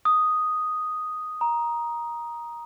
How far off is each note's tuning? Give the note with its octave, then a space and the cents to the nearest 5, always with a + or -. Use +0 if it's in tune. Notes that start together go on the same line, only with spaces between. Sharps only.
D#6 +0
A#5 +15